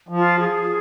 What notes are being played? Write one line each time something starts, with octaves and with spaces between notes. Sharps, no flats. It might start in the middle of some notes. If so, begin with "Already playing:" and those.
F3
F4
G#4